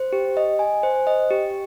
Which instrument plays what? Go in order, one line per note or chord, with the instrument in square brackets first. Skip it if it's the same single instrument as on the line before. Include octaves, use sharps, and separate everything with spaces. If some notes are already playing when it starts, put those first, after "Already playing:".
Already playing: [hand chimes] C5
G4
D#5
G#5
C5
D#5
G4